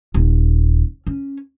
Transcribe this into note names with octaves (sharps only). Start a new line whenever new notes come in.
D#1
C#4